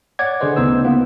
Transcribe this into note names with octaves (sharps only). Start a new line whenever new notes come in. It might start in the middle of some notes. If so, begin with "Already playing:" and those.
C#5 D5 F#5 D6 G#6
D3 G#4 B4 C5 D#5
D2 C#3 B3 D#4 C5 E6
A#3 B3 F4